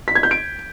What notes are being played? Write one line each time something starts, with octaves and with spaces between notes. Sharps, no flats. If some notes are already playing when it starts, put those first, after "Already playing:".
B6
G#6
G6
D7